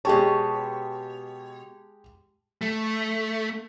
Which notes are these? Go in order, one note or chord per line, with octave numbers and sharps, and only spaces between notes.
B2 G#3 G4 C#5 A5
A3